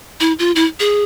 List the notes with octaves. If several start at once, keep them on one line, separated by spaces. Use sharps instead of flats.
E4
F4
E4
G#4